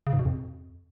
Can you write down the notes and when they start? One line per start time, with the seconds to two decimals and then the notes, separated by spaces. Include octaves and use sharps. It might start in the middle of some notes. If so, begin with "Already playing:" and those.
0.07 C#3
0.13 G#2
0.19 B2
0.25 F2